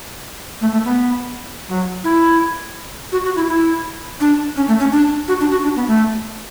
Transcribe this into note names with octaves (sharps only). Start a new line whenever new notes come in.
A3
A3
B3
F#3
E4
F#4
F#4
E4
E4
D4
C#4
A3
C#4
D4
F#4
D4
F#4
D4
B3
A3